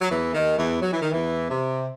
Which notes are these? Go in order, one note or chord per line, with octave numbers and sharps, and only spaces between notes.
F#3
E2 E3
D#2 D#3
E2 E3
F#3
E3
D#3
E2 E3
C3